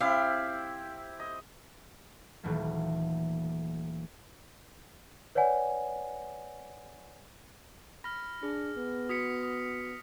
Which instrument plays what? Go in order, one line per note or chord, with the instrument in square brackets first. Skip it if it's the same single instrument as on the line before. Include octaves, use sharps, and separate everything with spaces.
[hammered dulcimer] C4 E4 G4 [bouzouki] F5
[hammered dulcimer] D#5
[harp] D#1 E3 F#3 A3 A#3
[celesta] B4 C#5 D5 F#5 G#5
[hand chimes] B5 [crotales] F6 A#6
[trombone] D4 [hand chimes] G#4
[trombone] B3
[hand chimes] F#4 [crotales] D#6 B6 C#7
[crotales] D#6